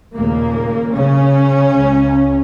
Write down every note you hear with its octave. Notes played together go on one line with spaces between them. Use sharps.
D#2 A#2 C#3 A#3
C#3 C#4
C#2 C#3